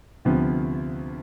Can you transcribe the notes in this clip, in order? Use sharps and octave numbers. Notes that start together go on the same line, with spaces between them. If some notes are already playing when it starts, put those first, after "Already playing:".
D2 C3 F3 B3